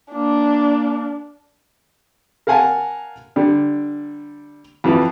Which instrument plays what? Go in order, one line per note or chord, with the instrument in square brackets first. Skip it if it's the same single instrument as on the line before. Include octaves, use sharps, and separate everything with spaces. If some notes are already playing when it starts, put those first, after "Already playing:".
[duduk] A#3 [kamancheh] D4
[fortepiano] A#4 F5 F#5 G#5 A5
D3 G3
F2 E3 F3